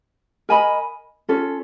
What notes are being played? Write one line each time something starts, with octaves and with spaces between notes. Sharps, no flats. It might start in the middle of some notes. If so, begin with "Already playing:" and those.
A#4 D#5 G#5 B5
C#4 F4 A4